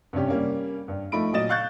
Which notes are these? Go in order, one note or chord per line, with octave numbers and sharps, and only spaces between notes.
G2 C3 C#4 G4
G3 A#3 C#4
G2
F3 A3 D#4 B5 D7
A#2 F#3 D#5 A6 E7
F5 C#6 F#6 G6 A6